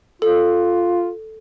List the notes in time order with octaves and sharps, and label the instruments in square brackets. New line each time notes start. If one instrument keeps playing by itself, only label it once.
[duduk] F4 [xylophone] A4